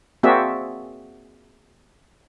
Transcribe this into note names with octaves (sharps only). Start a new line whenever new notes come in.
A#3 C4 F#4 G#4 D5 E5